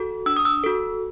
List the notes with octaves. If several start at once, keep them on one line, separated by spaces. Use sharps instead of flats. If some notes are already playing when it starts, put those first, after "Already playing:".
Already playing: F#4 A4
D4 E6
D#6
E6
F#4 A4